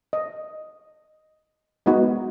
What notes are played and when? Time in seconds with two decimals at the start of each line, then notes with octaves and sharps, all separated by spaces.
0.13 D#5
1.86 G#3 B3 D#4 F#4